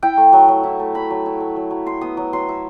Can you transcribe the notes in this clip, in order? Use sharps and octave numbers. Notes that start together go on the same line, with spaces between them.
E4 G5
A3
F#3
F#3
E4
A3
F#3 B5
F#3
E4
A3
F#3
F#3
E4 C6
B3 D#6
F#3
F#3 C6
E4